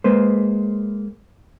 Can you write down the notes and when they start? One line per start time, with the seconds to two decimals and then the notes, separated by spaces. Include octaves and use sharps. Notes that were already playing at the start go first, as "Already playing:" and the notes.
0.04 G#3 A#3 B4 C5